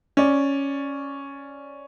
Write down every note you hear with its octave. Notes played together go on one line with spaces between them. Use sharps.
C#4 D5